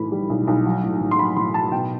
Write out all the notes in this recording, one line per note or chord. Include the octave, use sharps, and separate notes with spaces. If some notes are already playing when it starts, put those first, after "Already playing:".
Already playing: B1 A2 E3 B5
G3
B1
B1
F#3
A2
A1
C6
F#3 B5
A1 C6
F#3 A5
B2 G5